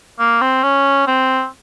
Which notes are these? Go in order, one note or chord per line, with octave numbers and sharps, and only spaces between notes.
A#3
C4
C#4
C4